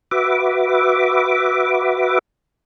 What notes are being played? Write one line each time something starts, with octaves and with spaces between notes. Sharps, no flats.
F#4 B4 E5 D6